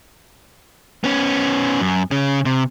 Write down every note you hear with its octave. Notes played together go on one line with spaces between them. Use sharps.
B3 C#4
F#2
C#3 C#4
C3